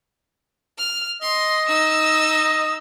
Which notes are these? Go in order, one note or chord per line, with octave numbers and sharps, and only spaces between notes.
F6
D#5 C6
D#4 E6